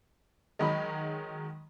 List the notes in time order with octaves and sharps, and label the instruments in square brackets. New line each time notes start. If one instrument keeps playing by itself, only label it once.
[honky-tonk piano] D#3 F#3 G#3 [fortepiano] D#5 B5